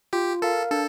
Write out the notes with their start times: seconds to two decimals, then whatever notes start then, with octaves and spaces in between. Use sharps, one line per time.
0.13 F4 G4
0.42 A4 A#4 F5
0.71 D4 A4